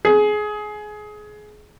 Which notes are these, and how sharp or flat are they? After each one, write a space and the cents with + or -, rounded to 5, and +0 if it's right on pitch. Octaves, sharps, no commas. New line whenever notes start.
G#4 +20